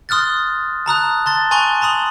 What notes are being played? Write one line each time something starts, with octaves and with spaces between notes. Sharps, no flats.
C6 D#6 F6 F#6 A6
A5 A#5 D#6 F#6
A5 C6 A6
G#5 A#5 C6 C#6 F#6 G7
A5 A#5 C6 D#6 F#7